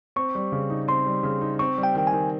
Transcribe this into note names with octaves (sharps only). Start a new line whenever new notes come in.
C4 C#6
G3
C#3
D#4
C4 C6
G3
C#3
D#4
C4 C#6
G3
G5
D#3 G5
G#5
D#3